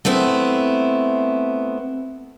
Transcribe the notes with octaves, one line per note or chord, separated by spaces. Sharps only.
A3 B3 C4 E4